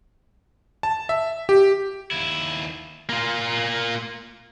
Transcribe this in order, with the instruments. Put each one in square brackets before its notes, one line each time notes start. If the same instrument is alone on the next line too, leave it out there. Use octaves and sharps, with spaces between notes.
[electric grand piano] A5
E5
G4
[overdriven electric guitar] D#2 E4
[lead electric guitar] A#3 F4